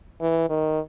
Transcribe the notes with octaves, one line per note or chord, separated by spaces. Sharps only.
E3
D#3